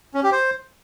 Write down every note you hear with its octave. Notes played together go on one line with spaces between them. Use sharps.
C#4
G4
C5